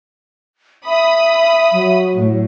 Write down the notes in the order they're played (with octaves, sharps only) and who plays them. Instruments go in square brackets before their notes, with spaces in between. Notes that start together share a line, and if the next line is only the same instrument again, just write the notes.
[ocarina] E5 [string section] B5 D#6
[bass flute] F#3
[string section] A2